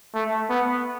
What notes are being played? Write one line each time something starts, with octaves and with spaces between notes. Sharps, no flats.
A3
B3